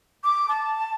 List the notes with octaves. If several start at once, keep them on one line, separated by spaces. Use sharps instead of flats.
D6
A5